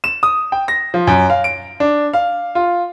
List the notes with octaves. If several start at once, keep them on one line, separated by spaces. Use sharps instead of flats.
E7
D#6
G5
A#6
F3
F#2
F5
D7
D4
F5
F4